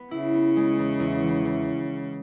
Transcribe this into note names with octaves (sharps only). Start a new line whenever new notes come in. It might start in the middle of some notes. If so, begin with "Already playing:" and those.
Already playing: B3
C#3 E4
B3
G#3
E2
E2
E3
E3